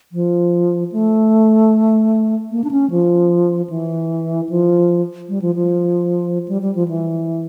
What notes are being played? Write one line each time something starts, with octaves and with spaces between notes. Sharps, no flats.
F3
A3
A#3
D4
C#4
F3
E3
F3
G3
F3
F3
G3
G3
F3
E3